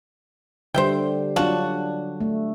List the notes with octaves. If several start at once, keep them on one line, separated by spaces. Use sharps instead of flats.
D3 G3 C5 E5 G5
F#3 D4 F4 F#4 A5
A3